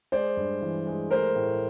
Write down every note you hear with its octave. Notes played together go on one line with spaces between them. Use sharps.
G#3 C5 D5
G2
E3
G#3
A3 A#4 C5
A2